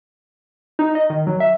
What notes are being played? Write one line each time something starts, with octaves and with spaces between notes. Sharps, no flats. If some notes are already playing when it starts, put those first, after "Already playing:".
D#4
D#5
D#3
F#3
E5